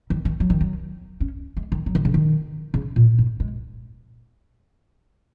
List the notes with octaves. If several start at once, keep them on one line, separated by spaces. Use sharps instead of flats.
D#3
D#3
F#3
D#3
F#3
C#4
G#3
D#3
F#3
D#3
C#3
D#3
C#3
A#2
G#2
G#3